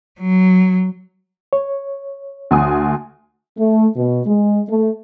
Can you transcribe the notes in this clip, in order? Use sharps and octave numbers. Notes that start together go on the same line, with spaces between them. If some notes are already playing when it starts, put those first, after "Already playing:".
F#3
C#5
D2 G#5 D#6
A3
B2
G#3
A3